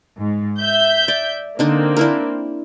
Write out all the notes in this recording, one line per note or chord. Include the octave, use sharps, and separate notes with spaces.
G#2
E5 G6
D5
D3 A#3 C4 D4 D#4
D4 E4 A#4